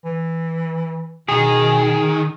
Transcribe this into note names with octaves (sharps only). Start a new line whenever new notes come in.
E3
B2 D#3 G#4